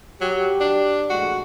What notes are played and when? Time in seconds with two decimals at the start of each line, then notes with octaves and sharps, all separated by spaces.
0.21 F#3 G4
0.61 D4
1.10 A#1 A2 G#3 F#4